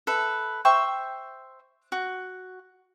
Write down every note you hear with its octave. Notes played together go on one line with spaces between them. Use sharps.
A4 B4 E5
C5 E5 G5 C#6
F#4